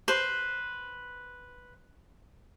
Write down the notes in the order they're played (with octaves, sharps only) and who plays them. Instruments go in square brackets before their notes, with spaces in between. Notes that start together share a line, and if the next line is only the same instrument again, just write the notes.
[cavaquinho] B4 C5